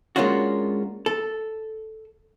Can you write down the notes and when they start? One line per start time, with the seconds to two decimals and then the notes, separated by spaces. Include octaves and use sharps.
0.16 G#3 A#3 C#4 D4 F4 F#4
1.06 A4